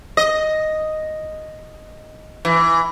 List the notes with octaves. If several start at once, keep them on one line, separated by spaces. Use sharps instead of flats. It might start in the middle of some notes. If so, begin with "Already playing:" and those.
D#5
E3